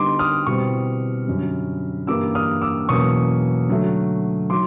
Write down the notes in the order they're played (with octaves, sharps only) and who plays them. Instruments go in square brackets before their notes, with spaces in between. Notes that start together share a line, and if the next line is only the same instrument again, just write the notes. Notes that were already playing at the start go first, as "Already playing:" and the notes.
Already playing: [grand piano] D3 G3 B3 D#4 C6 D6
D#6 F6
B2 G3 C4 E4 C#6 D#6
F#2 D3 G3
G2 E3 G3 A#3 D6 E6
D#6 F6
D6 E6
E2 B2 F#3 A#3 C#4 C#6 D#6
D3 F#3 A3
D#3 F#3 C6 D6